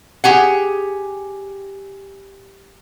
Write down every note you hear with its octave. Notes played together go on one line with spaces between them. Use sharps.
G4 G#4 F#5